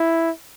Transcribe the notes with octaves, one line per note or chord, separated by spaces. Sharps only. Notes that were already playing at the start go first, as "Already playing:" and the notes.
Already playing: E4